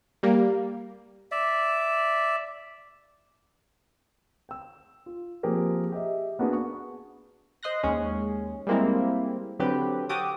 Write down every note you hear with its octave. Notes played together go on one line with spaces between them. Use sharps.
G3 A#3
D5 E5
G5 E6
F4
F3 A#3 C4 G4 G#4 A#4
G4 D#5 E5
A#3 B3 D4 F#4 G#4 B4
C#6
C5 D#5 C6 F#6 A#6
D#2 G#3 C#4
G3 G#3 A#3 C4 E4
D3 F#3 C4 G4 B4
F#4 G4 A4 D6 D#6